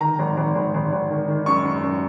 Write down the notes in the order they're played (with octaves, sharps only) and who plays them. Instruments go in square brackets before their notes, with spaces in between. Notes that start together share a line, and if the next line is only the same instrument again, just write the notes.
[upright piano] D#3 A#5
G#1
G#1
G#1
G#1
G#1
D#3
D#3
F#2 C#6
F#2
F#2